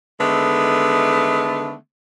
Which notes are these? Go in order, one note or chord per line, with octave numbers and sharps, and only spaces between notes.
D3 D#3 G#3 A3 B3